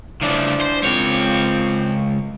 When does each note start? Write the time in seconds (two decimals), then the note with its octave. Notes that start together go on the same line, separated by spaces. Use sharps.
0.22 C#3 E3 F3 A3 D4
0.61 C5
0.83 C#2 F3 A#3 C4 C#5